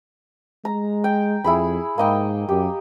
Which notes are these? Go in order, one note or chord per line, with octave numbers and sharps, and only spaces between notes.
G#3 A#5
G5
F2 E4 G#4 B5
G#2 A#3 D#5 G5
F#2 G4